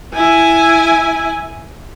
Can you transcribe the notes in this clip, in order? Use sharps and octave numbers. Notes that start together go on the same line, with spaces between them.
E4 G#5